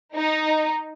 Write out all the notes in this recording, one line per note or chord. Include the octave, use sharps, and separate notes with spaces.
D#4